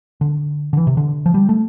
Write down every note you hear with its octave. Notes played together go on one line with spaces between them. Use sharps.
D3
D3
E3
C3
D3
F3
G3
A3